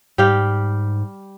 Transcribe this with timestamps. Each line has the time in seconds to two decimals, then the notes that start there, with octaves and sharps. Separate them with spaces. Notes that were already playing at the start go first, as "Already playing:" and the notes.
0.18 G#2 G3 G4 F5